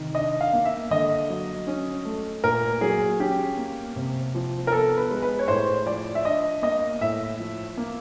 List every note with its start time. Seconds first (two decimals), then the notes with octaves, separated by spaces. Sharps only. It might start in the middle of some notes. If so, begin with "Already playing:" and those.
Already playing: C3 D#3
0.15 D4 D#5
0.41 F5
0.53 A#3
0.65 E5
0.91 D3 D#5
1.29 F#3
1.67 C#4
2.05 A3
2.44 A#2 A#4
2.81 F#3 G#4
3.20 C#4 G4
3.57 A#3
3.96 C3
4.35 F3
4.67 A#4
4.71 B3 A4
4.97 B4
5.10 G#3
5.22 B4
5.39 C#5
5.48 A2 C5
5.86 F3 D5
6.15 E5
6.25 D4 D#5
6.62 A#3 D#5
7.01 A2 E5
7.39 F3
7.77 A#3